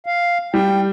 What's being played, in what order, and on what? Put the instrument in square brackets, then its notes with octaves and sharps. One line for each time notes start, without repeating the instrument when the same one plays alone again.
[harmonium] F5
[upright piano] G3 [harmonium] G5